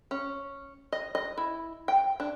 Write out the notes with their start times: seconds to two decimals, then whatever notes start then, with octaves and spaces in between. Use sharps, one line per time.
0.11 C#4
0.92 D#5
1.15 D#5
1.38 E4
1.88 G5
2.20 D4